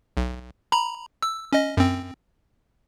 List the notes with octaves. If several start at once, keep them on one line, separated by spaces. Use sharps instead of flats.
B1
A#5 B5
E6
C#4 D#5
F#2 C4